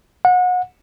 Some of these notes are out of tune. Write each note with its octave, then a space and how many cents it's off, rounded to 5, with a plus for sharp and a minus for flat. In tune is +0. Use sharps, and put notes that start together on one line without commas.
F#5 -30